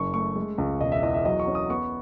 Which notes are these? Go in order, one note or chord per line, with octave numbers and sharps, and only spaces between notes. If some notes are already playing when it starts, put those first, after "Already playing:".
Already playing: F#1 C#6
A3 C#6
G#3
C#2
E1 D#5
E5
E2 D#5
E5
F#3 D#5
C#6
C#4
D#6
B3 C#6